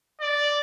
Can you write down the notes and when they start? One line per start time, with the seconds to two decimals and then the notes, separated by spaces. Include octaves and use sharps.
0.21 D5